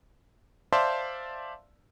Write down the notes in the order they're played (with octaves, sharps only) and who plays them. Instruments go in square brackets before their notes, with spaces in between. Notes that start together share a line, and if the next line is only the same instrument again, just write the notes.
[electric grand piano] C5 D5 E5 F5 A5 C6